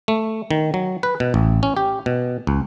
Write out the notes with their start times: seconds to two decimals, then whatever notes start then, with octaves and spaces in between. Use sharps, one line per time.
0.08 A3
0.51 D#3
0.74 F#3
1.03 B4
1.20 B2
1.34 A1
1.63 C#4
1.77 G4
2.06 B2
2.47 C#2